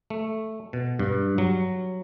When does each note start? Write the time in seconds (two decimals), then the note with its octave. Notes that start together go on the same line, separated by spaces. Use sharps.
0.10 A3
0.73 B2
0.99 G2
1.38 F#3